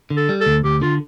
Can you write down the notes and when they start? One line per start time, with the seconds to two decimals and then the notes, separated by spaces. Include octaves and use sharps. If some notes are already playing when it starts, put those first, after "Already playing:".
0.10 D3
0.16 A4
0.29 G3
0.40 A4
0.46 D2
0.64 D2 G4
0.81 D3 F4